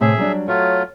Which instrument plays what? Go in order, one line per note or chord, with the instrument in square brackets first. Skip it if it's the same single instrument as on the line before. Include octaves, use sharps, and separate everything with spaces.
[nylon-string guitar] A2 C3 [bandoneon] G#4 E5
[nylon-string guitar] F#3 G3 D4
[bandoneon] F#3 A3 F4 [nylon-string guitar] C#5